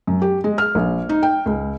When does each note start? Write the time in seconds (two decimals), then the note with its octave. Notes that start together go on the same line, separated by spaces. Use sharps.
0.07 F#2
0.22 G4
0.44 G#3
0.58 F6
0.75 A#1
1.09 D#4
1.23 G5
1.46 C#2